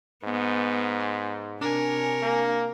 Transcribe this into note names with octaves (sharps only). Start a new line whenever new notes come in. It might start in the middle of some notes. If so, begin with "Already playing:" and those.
G#2 B3
C6
C3 D4 A#4 C#5 G#5
A#3